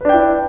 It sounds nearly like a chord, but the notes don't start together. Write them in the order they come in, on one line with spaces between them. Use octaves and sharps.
B4 D4 G5 E4